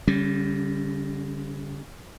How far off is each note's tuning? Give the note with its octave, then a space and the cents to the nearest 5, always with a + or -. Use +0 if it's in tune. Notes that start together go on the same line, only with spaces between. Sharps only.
D3 -40 G3 +0 C#4 +0